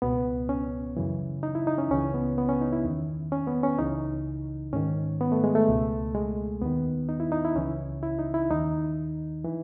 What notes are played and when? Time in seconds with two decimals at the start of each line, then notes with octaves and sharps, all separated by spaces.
0.02 C#2 B2 B3
0.49 C#4
0.97 F#2 C#3 E3
1.43 D#4
1.55 E4
1.67 D#4
1.78 C#4
1.91 C#2 C#3 E3 C#4
2.14 B3
2.38 B3
2.49 C#4
2.61 D#4
2.73 E4
2.84 E2 D#3
3.32 C#4
3.47 B3
3.63 C#4
3.79 C#2 C#3 E3 D#4
4.73 G#2 D#3 C#4
5.21 B3
5.32 A3
5.44 G#3
5.55 A3
5.67 C#2 B2
6.15 G#3
6.62 D#2 D#3 B3
7.09 D#4
7.20 E4
7.32 D#4
7.45 E4
7.56 C#2 C#3 E3 C#4
8.03 E4
8.19 D#4
8.34 E4
8.50 D#2 D#3 D#4
9.44 E3